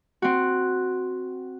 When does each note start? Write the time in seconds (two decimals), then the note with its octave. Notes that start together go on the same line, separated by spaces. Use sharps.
0.22 C4 F#4